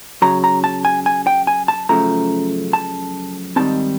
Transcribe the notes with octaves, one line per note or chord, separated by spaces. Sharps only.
F#2 C#3 F#3 A#5
A#5
A5
G#5
G#5
G5
G#5
A5
F#2 C#3 F3 A3 A#5
A5
G#2 D#3 G3 C4 A5